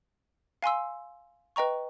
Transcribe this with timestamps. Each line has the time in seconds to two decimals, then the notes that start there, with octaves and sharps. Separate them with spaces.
0.62 F5 G#5 C6 E6
1.56 B4 D#5 G5 A#5 C#6